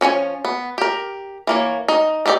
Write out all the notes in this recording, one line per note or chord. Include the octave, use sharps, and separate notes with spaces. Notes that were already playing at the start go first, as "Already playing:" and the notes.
F3 C#4 C#5 G#5
B3
G4 A#4
E3 A#3 C#5
D#4
D4 D#4 G4 A4 D5